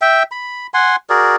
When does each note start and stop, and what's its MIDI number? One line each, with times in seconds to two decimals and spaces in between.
0.01 0.23 76
0.01 0.23 79
0.32 0.67 83
0.74 0.96 78
0.74 0.96 80
0.74 0.96 84
1.10 1.36 66
1.10 1.36 68
1.10 1.36 70
1.10 1.36 74